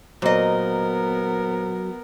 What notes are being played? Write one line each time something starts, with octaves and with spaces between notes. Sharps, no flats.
A#2 F#3 B3 A#4 C5 D#5 A#5